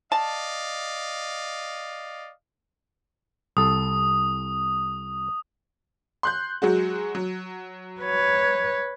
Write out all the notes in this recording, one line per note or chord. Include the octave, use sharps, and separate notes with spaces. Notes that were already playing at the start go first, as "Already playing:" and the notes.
D5 D#5 F5 A5
C2 A4 D#6
C6 F#6 G6
F#3 G#3 F#4
F#3
B4 C#5